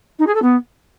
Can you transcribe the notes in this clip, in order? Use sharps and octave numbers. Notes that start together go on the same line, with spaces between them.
D#4
G#4
A4
B3